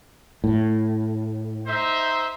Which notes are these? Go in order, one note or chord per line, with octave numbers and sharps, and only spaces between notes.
A2
D#4 C5 E5